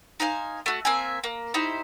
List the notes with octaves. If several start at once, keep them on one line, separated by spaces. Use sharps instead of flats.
D#4 C5 F5 G#5
A3 F#4
A#3 C4 E5 G#5
A#3
D#4 E4 G4 C5